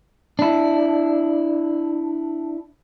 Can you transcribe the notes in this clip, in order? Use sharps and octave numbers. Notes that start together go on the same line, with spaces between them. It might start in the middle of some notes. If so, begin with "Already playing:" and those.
D4 E4